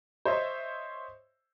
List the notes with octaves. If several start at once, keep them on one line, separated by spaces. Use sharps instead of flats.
C5 C#5 D#5 E5